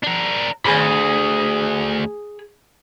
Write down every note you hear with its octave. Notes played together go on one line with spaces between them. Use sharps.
D4 A#4
D2 G#4 B5